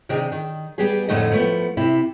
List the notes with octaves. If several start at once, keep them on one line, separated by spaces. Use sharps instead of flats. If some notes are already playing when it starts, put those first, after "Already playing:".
C3 D#3 D4 D#4 G#4
D#3
G3 B3 G4 G#4
F2 A2 D3 A3 D#4 D#5
F3 A3 B3
C3 E4